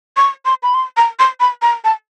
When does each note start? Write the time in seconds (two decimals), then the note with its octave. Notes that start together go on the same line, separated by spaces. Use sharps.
0.17 C#6
0.45 C6
0.63 B5
0.74 C6
0.97 A#5
1.19 C6
1.40 B5
1.62 A#5
1.84 A5